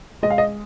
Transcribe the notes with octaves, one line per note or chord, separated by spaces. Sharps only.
G#3 D#5
F5
D#5